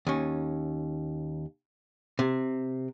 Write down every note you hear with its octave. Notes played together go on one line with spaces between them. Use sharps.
D#2 C#4
C3